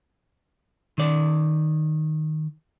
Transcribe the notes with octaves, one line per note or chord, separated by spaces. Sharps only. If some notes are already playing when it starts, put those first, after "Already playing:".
D#3 D5